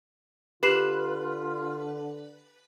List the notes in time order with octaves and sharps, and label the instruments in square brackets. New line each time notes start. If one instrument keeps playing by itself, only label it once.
[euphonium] D3 [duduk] F4 [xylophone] G4 C7 E7 [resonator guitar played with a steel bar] B4